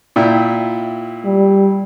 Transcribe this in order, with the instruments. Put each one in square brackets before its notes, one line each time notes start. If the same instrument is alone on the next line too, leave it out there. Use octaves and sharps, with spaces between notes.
[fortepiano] A#2 E4 G5
[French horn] G3